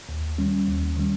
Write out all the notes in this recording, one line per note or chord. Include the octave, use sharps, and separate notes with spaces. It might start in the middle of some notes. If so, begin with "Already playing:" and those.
D#2
D#3 G3 C#4
D#2
D#3 G3 C#4